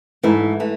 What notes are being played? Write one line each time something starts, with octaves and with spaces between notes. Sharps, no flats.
G#2 E3 A3 E4
E3 A3